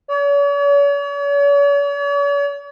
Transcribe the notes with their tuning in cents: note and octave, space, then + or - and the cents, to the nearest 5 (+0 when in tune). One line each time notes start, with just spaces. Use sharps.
C#5 +45